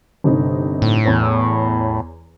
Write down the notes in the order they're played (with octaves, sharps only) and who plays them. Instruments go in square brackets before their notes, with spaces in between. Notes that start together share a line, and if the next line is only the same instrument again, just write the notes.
[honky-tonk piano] G1 C3 D#4
[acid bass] A2
[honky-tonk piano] E2 C#5